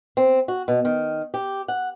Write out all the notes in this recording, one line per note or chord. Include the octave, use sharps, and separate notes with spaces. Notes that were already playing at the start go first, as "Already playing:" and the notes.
C4
F#4
B2
D#3
G4
F#5